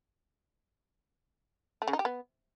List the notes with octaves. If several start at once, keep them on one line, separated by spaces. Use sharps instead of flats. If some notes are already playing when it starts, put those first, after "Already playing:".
A3
C#3
D#4
G4
B3